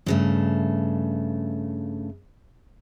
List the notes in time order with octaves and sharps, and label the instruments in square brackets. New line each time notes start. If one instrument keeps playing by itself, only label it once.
[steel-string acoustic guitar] G2 C#3 A3